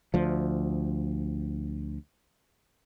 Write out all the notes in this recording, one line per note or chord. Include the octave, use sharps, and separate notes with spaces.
D2 F3